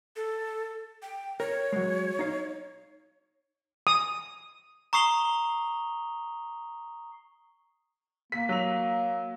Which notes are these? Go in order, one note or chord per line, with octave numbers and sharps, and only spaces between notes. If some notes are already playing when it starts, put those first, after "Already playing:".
A4
G5
A#4 C#5
F#3 G#3
D#4 F5
D#6
A#5 C#6 D#6 C7 F7 G7
A#3 B6
F#3 F7